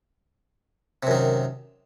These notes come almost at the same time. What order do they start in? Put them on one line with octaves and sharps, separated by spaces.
C3 F#2 D#3